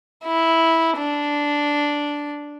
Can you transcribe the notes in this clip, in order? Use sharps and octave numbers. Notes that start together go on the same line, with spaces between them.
E4
D4